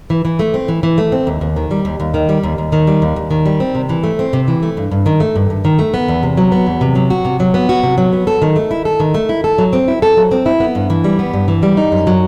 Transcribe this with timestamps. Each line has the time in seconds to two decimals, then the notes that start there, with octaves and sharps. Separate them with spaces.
0.10 E3
0.25 E3
0.39 A3
0.54 C4
0.68 E3
0.83 E3
0.98 A3
1.12 C4
1.27 D#2
1.41 D#2
1.56 D#3
1.71 G3
1.85 D#2
2.00 D#2
2.14 D#3
2.29 G3
2.43 D#2
2.58 D#2
2.72 D#3
2.87 G3
3.02 D#2
3.16 D#2
3.31 D#3
3.46 G3
3.60 C4
3.75 C3
3.89 E3
4.04 A3
4.19 C4
4.33 C3
4.48 E3
4.63 A3
4.77 G2
4.91 G2
5.06 D#3
5.20 A3
5.36 G2
5.50 G2
5.65 D#3
5.79 A3
5.94 B3
6.08 E2
6.23 C3
6.38 F#3
6.52 B3
6.67 E2
6.81 C3
6.95 F#3
7.10 F#4
7.25 C3
7.40 F#3
7.54 B3
7.69 F#4
7.83 C3
7.98 F#3
8.13 B3
8.27 A4
8.42 D#3
8.56 A3
8.71 E4
8.85 A4
9.00 D#3
9.14 A3
9.29 E4
9.44 A4
9.58 F#3
9.73 C4
9.88 E4
10.02 A4
10.17 F#3
10.31 C4
10.46 E4
10.60 B3
10.75 G2
10.90 E3
11.04 G3
11.19 B3
11.33 G2
11.48 E3
11.63 G3
11.77 D#4
11.92 F#2
12.07 F#3